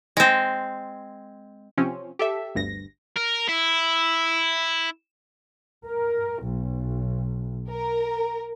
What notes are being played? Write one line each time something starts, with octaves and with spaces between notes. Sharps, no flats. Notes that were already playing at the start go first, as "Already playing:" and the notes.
G#3 C4
C3 F3 C4 C#4
G4 A4 E5
G1 D2 G2 A#6
A#4
E4
A#4
B1
A#4